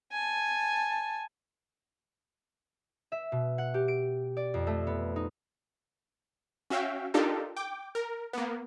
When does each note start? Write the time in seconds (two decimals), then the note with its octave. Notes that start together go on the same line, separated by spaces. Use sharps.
0.12 G#5 A5
3.12 E5
3.32 B2
3.58 F#5
3.74 G4
3.88 D7
4.37 D5
4.54 F2
4.67 A3
4.87 B3
5.16 D#4
6.70 C#4 F#4 E5 F5 G5
7.14 D4 D#4 F4 G4 A4 A#4
7.57 G5 D6
7.95 A#4
8.33 A#3 B3